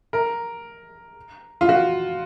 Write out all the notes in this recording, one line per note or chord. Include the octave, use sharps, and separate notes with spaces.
A#4
F4
F#4